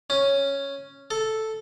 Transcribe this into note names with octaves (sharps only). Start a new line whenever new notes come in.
C#4
A4